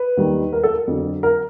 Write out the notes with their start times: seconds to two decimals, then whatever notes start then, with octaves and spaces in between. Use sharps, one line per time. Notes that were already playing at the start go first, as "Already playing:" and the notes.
Already playing: B4
0.17 D#2 D#3 G3
0.53 A#4
0.63 A4
0.74 A#4
0.87 F2 D3 F#3
1.23 A#4